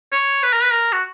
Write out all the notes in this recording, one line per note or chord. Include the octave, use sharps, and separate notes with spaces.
C#5
B4
A#4
B4
A#4
F#4